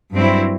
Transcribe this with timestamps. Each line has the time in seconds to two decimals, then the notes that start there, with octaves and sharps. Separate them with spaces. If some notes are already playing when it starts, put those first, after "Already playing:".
0.13 G2 F#3 C4 E4